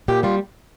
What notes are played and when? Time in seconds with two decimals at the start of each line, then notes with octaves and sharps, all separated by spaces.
0.08 A#2 G4
0.23 G3 F4